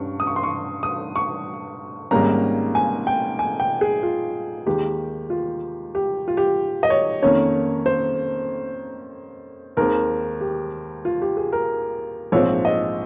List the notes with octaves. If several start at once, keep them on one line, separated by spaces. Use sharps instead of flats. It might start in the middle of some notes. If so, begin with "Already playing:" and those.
Already playing: G2 G3 C#4 C#6
D#6
C#6
C6
C#6
D#6
C#6
G#1 G#2 G3 A#3 C#4 A#5
G#5
G5
G#5
G5
G#4
F4
D#2 D#3 G#3 G4
F4
G4
F4
G4
D#5
C#5
F2 D#3 A#3 C#4 C#5
C5
D#2 D#3 G#3 C4 A#4
G4
F4
G4
G#4
A#4
A#1 G#2 F3 C4 C#5
D#5